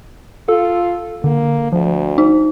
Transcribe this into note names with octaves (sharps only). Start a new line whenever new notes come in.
F4 A4
D3 A#3
D2 F3
D#4